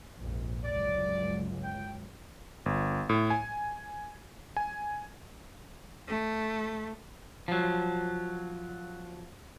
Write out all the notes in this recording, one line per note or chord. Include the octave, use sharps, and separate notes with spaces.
A#1 F2 G#2
G1 C#2 F#3 D5
G5
G1
A2
G#5
G#5
A3
F3 F#3